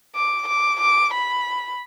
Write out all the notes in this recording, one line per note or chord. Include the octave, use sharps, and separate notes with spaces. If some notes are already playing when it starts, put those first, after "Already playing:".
D6
D6
D6
B5